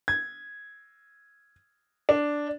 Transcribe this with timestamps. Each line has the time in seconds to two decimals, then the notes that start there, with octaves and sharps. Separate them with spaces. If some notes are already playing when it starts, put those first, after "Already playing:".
0.08 G#6
2.09 D4